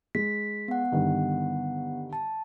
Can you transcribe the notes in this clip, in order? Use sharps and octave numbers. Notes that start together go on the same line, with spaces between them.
G#3 B6
B3 F#5
G2 D3 D#3
A5